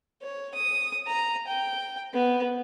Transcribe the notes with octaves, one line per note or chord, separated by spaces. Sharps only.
C#5
D#6
A#5
G5
B3